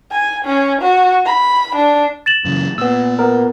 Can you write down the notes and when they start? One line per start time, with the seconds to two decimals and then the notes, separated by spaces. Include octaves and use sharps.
0.11 G#5
0.45 C#4
0.82 F#4
1.25 B5
1.76 D4
2.26 A6 E7 F#7
2.44 F#2 C#3 E3
2.78 A#2 B3 E6
3.19 B3 A#4